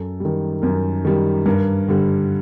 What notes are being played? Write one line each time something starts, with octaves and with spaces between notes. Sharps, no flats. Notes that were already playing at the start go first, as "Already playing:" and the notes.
Already playing: F#2 A4
D#3 G3
F#2 A#4
D#3 G3
G2 A#4
D3 G3